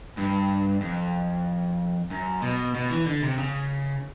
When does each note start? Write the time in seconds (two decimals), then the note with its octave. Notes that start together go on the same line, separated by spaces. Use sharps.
0.17 G2
0.81 F2
2.10 F#2
2.42 B2
2.74 B2
2.90 E3
3.06 D3
3.22 C3
3.37 C#3